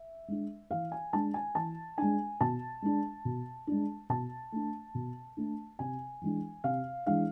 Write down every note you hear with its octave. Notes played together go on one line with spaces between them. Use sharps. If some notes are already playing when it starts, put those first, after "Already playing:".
Already playing: E5
G#3 D4
E3 F5
G#5
G#3 D4 A5
G#5
E3 A5
G#3 D4 G#5
B2 A5
G#3 D4
B2
G#3 D4
B2 A5
A3 D4
B2
A3 D4
C3 G#5
E3 G#3 D4
C3 F5
E3 G#3 D4 F5